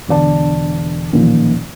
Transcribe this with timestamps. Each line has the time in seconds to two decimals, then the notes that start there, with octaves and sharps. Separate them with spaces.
0.08 E1 D3 D5 A5
1.13 A1 A#2 D#3 F3